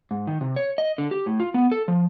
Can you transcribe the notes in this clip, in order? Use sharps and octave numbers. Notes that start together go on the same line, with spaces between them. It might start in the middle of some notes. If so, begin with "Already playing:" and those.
G#2
D#3
C3
C#5
D#5
D3
G4
A2
F4
B3
A4
F3